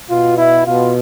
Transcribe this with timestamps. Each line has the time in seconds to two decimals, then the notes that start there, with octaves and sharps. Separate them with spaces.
0.10 B2 F4
0.38 E4
0.67 B2 F4